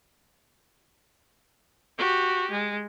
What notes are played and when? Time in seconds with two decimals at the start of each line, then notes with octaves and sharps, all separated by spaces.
1.98 F#4 G4
2.51 G#3